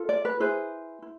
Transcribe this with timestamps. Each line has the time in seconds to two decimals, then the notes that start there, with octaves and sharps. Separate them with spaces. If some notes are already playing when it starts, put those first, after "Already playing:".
Already playing: F4 A4
0.09 D5
0.25 B4
0.40 E4 G#4 B4 C5
1.02 E4